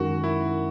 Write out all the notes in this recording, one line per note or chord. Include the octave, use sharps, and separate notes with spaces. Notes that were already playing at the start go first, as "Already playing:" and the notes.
Already playing: F#2 D#3 G#3 F#4
E4